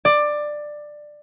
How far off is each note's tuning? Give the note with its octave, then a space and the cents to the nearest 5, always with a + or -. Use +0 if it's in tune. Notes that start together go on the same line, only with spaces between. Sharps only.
D5 +15